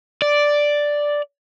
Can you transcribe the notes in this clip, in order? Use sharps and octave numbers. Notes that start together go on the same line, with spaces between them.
D5